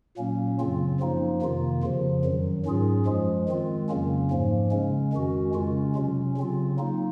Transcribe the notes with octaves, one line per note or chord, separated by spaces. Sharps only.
A#2 F#3 A#3 C#4
F#2 C#3 F#3 C4 F4
F#2 F3 A#3 D#4
F2 C3 D#3 A#3 F4
F2 C#3 F3
F#2 D#3 F#3
G#2 F#3 C#4 F4 G#4
F#2 F3 G#3
D#3 G#3 C4 F4
F2 C#3 F#3 A#3 C#4
G#2 F3 A#3
C#3 G#3 C#4
F2 D#3 G#3 C#4 F#4
C#3 G#3 C#4 F4
C3 F#3 C#4
C#3 F#3 C4 F4
F#3 A#3 D#4